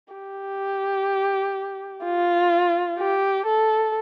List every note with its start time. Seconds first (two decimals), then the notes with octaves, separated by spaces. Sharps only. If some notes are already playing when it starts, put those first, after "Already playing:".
0.14 G4
2.04 F4
2.99 G4
3.46 A4